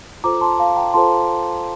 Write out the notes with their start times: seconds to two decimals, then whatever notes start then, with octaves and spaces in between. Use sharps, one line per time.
0.24 F4 A4 C5 A#5 D6
0.41 A5 C6
0.59 F5 A5
0.76 G5 A#5
0.94 F4 A4 C5 A5 C6